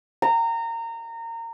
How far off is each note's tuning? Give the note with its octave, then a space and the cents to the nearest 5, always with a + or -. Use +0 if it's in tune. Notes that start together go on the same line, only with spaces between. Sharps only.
A#5 -25